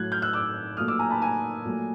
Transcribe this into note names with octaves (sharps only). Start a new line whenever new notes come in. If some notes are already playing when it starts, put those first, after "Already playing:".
Already playing: A2 F#3 A3 F#6 G#6
F6 G6
E6 F#6
D6 E6
A#2 F#3 A3 D#6 F6
D6 E6
G#5 A#5
A5 B5
G#5 A#5
A#2 F#3 A3